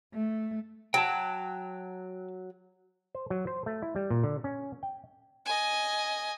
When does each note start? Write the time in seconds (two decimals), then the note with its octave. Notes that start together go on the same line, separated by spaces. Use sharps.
0.14 A3
0.94 F#3 G5 A5
3.15 C5
3.30 F#3
3.47 C5
3.66 A3
3.82 E4
3.96 G3
4.10 A#2
4.24 D3
4.44 C#4
4.83 G5
5.45 D#5 G#5